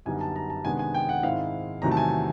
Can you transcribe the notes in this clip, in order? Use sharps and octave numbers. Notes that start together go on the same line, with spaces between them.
F#2 D3 G3 B3 D#4 G#5
A5
A#5
A5
C3 D#3 G#3 B3 D4 G#5
G#5
G5
F#5
G#2 D#3 G#3 C4 E4 F5
E2 C3 D#3 F#3 A3 A#5
A5
G#5